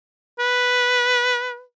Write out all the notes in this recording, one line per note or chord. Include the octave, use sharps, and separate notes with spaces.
B4